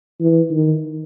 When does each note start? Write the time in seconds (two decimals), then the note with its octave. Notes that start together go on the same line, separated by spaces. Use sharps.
0.20 E3
0.50 D#3